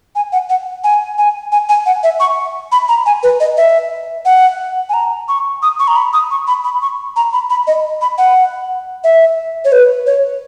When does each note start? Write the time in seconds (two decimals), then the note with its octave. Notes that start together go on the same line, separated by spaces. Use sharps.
0.15 G#5
0.32 F#5
0.50 F#5
0.84 G#5
1.18 G#5
1.52 G#5
1.69 G#5
1.86 F#5
2.03 E5
2.20 C#6
2.72 B5
2.89 A#5
3.06 G#5
3.23 B4
3.40 D#5
3.57 E5
4.25 F#5
4.89 G#5
4.94 A#5
5.28 C#6
5.62 D#6
5.80 C#6
5.88 A#5
5.96 B5
6.13 D#6
6.31 C#6
6.47 B5
6.64 B5
6.82 C#6
7.16 A#5
7.33 B5
7.50 B5
7.67 D#5
8.01 B5
8.18 F#5
9.04 E5
9.65 C#5
9.72 B4
10.07 C#5